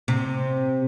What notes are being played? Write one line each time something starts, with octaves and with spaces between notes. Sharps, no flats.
C3